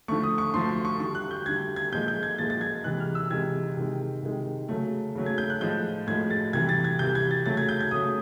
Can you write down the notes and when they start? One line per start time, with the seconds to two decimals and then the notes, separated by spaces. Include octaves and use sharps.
0.08 D3 F3 A3 C#6
0.23 D#6
0.38 C#6
0.54 D3 F3 A3 C6
0.69 C#6
0.85 C#6
1.00 D3 G3 C#6
1.15 F#6
1.31 G6
1.46 D3 G3 G#6
1.76 G#6
1.92 A#2 F3 G#3 G6
2.08 G6
2.23 G#6
2.38 A#2 F3 G#3 A6
2.50 A6
2.61 G#6
2.84 C3 E3 G#3 F#6
3.00 F6
3.15 E6
3.30 C3 E3 G#3 G#6
3.77 C3 D#3 G#3
4.23 C3 D#3 G#3
4.69 C#3 F#3 A3
5.15 C#3 F#3 A3
5.26 G#6
5.38 G6
5.50 F#6
5.61 A2 F3 G#3 G6
6.07 A2 F3 G#3 G#6
6.30 A6
6.53 C3 E3 G3 G#6
6.69 A6
6.84 G#6
6.99 C3 E3 G3 G6
7.15 G#6
7.31 A6
7.46 C#3 F#3 A3 A6
7.57 G#6
7.69 G6
7.81 G#6
7.91 C#3 F#3 A3 D#6